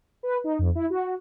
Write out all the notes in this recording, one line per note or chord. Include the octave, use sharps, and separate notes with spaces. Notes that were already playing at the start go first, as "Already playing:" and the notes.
B4
D#4
F2
E4
F#4